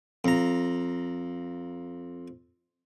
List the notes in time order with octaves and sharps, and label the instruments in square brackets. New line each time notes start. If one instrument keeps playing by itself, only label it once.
[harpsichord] F2 A#5